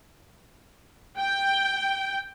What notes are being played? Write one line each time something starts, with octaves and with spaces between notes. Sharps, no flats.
G5